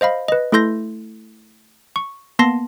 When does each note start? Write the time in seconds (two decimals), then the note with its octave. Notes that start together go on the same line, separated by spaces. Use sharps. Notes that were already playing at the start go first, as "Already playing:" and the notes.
0.01 C5 D#5 F5 B5
0.28 B4 D#5
0.52 A3 E4 A4 C6 G6 A#6
1.96 C#6
2.39 A#3 B3 A5 C6 A#6 C7